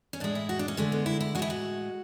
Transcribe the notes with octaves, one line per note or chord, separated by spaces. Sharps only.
C#4
A2 G#3 D4
E4
F#4
D4
C#4
D3 G#3 A3
B3
E4
E4
A2 G#3 E4 F#4
F#4